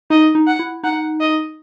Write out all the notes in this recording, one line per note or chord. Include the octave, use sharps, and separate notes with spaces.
D#4 D#5
D#4
F#5
E4
D#4 F#5
D#5